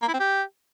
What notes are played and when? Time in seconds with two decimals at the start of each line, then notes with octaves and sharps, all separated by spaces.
0.02 A#3
0.08 E4
0.14 C4
0.20 G4